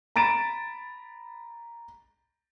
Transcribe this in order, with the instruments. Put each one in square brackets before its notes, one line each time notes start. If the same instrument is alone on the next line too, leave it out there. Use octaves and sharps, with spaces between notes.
[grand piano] A#5 B5 A6 D7 E7